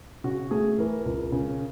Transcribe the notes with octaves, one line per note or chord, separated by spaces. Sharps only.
C#3 F#4
A3 G#4
E3 A#4
C#2
C#3